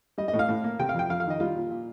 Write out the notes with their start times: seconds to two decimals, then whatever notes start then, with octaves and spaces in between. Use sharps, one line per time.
0.18 G3 D#5
0.28 D#5
0.34 A2
0.39 F5
0.49 A2
0.64 A#3
0.79 C3 G5
0.89 F5
0.94 F2 G5
1.09 F2 F5
1.20 F5
1.26 D#3 D#5
1.40 G3 F4
1.55 A#2
1.70 A#2